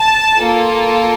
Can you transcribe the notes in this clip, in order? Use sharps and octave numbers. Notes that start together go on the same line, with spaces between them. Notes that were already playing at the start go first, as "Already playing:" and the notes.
Already playing: A5
A#3 F4 A4